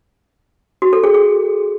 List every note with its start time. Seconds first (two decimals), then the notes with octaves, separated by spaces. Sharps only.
0.82 F#4
0.93 A4
1.04 G#4
1.14 G#4